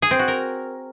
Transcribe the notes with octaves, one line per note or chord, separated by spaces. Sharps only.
G#4
C4
F#4
A#4